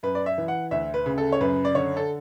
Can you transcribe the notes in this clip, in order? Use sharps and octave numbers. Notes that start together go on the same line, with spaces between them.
F#2 B4
D5
E5
E3
F#5
D2 E5
B4
C#3
A4
C#5
F#2 B4
D5
D3 C#5
A4